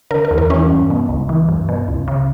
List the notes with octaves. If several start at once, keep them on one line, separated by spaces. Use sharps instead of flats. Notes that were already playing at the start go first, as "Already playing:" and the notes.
D3 A#4
A#4
E2
A#4
E3 C#4
G2
B2
C#2
E3
G2
B2
C#2
C#3